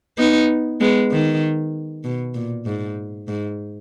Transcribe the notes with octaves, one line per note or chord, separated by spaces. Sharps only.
B3 D#4
G#3 B3
D#3
B2
A#2
G#2
G#2